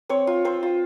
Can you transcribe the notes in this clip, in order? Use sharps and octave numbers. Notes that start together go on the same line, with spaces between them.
C4 C#5
F4
C4 C5
F4